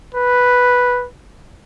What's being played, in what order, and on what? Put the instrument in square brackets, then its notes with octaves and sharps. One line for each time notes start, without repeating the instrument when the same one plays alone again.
[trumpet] B4